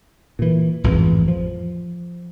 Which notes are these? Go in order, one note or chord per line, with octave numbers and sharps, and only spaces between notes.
A#2 E3
A1 F2 G#2 E3
F3